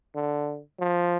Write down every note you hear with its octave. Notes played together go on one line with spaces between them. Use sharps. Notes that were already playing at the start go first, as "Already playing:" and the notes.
D3
F3